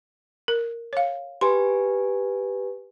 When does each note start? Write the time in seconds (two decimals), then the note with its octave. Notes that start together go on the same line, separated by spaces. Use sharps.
0.48 A#4
0.93 C#5 F5
1.41 G4 B4 G#5 C6